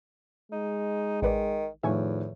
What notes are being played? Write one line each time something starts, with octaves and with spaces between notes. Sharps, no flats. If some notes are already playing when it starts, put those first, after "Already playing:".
G#3 D#4
A1 D#3 B4 D5
E2 A2 D#3 F3 E5 G#5 C#6